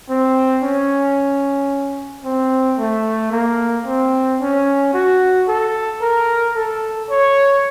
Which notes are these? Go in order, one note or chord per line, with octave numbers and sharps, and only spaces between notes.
C4
C#4
C4
A3
A#3
C4
C#4
F#4
A4
A#4
A4
C#5